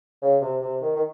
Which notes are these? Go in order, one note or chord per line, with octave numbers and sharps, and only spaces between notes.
C#3
C3
C3
D#3
D#3